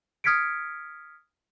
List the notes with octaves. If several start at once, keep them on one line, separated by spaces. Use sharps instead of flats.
D#6 F6 G#6 B6 C#7 D7